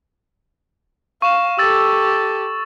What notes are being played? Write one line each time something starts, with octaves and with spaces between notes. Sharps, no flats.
F5 C#6 E7
G4 A4 E6 A6